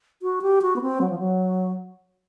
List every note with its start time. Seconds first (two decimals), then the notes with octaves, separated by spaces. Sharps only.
0.22 F#4
0.42 G4
0.62 F#4
0.76 B3
0.82 C4
1.01 F#3
1.10 F3
1.19 F#3